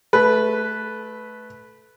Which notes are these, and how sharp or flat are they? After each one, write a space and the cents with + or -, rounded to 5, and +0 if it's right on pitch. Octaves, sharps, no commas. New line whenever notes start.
A3 -15 B4 +0